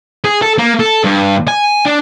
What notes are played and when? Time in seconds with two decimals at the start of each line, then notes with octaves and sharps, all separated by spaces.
0.24 G#4
0.42 A4
0.58 A#3
0.80 A4
1.04 G2
1.48 G#5
1.86 D4